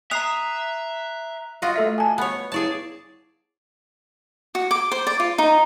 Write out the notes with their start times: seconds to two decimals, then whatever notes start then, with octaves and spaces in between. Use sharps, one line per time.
0.11 E5 A#5 D#6 F#6 C7 F7
1.62 F4 F#4 D#5
1.76 A3 A4 E5
1.98 G#5 A5
2.18 B3 C#5
2.52 E4 G#4 C#5 D5 A5
4.55 F#4
4.71 D6
4.92 C5
5.07 D5
5.20 F4
5.38 D#4